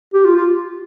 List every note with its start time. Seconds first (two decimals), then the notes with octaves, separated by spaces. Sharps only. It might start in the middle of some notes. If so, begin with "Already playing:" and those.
0.14 G4
0.25 F4
0.36 F4